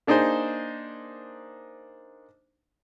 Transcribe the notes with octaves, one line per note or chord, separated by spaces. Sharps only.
A#3 D4 D#4 G#4 C5